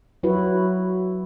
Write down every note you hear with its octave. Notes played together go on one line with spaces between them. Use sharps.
F#3 E4 F#4 B4